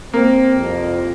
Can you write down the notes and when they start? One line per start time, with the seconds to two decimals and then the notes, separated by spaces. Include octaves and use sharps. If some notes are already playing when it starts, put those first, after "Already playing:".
0.13 A#3 C4
0.55 C2 F2